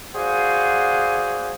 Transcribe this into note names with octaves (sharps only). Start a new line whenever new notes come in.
F#4 G#4 C5 D5 F5 F#5